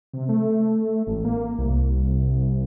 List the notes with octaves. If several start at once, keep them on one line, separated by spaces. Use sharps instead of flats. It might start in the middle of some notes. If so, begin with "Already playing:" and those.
C3
A3
A1
A#3
C2